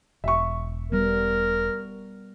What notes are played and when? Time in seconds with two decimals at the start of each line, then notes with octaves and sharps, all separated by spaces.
0.24 E1 E5 C#6
0.92 G3 B3 A#4